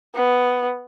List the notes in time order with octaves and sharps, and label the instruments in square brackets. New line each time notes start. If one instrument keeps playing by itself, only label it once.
[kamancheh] B3